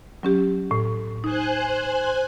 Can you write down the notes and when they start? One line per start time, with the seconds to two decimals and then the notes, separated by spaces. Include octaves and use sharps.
0.23 F#3 C#4 G4
0.71 A2
1.24 D#4 C5 G#5 F#6